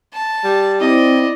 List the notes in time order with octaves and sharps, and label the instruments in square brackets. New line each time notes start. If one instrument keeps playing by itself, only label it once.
[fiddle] A5
[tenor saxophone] G3
[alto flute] C4 [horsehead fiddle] E4 [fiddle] D5 D#5